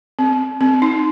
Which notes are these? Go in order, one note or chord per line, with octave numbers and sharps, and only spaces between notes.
C4
C4
D#4